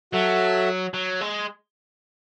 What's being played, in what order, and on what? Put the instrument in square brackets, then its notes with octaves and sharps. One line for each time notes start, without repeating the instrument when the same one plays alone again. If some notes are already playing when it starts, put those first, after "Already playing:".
[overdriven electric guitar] F#3 [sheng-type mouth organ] F#4 A4 E5 A5
[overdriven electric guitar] F#3
G#3